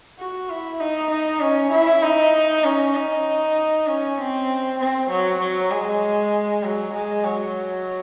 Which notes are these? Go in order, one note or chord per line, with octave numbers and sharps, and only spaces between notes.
F#4
E4
D#4
D#4
C#4
E4
D#4
C#4
D#4
C#4
C4
C4
F#3
F#3
G#3
F#3
G#3
F#3